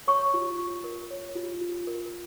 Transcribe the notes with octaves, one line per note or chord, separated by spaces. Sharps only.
C#5 C#6
F4
F4
A#4
C#5
F4
F4
A#4